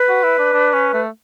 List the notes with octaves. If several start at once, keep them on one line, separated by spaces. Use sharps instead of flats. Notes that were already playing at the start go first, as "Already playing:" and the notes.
Already playing: B4
F#4
E4
D4
D4
C#4
A3